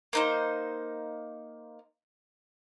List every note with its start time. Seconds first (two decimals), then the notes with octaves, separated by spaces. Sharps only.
0.13 A#3 D#4 C5